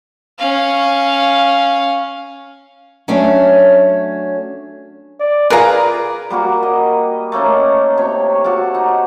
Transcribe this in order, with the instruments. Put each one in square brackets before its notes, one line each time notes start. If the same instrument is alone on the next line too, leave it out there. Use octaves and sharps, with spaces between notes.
[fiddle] C#4 F5
[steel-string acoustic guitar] F#3 A3 C#4 D4
[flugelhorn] D5
[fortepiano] F4 G#4 B4 [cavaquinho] A#4 A#5 [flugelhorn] D5
[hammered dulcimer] G3 A#3 F#4 A#4
D#5
A3 A#3 C#4 D#4
C3 C#5
F#4 A4 D5 F5
D#4